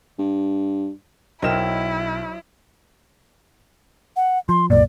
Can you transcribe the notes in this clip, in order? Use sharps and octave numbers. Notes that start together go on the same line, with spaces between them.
G2
B1 F#3 E4 A#4 C5 D#5 G5 E7
F#5
F3 C6
C2 F#2 A#2 D5